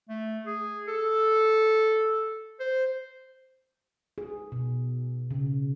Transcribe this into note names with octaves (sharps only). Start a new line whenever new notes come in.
A3
G#4
A4
C5
G#4
B2
C#3